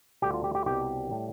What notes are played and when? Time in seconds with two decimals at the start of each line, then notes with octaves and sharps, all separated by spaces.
0.22 D2 D3 G3 G4
0.34 F4
0.44 G4
0.55 G4
0.66 C2 B2 G3 G4
1.11 A2 G3